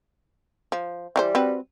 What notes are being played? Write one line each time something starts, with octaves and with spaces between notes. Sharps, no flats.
F3
E3 G3 F#4 C5
C4 F#4 B4